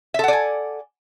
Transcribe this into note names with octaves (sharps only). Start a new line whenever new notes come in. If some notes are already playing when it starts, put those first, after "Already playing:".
A4 D5 E5 F#5 G#5